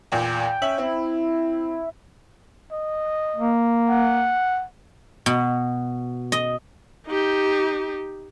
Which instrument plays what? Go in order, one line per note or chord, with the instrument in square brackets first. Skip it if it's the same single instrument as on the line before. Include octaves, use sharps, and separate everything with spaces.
[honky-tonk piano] E2 A#2 [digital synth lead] G5
[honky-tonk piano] C#4 E5 F#7
[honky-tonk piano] C4 [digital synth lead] E4
[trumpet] D#5
[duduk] A#3
[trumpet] F#5
[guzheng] B2
D#5
[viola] D#4 G4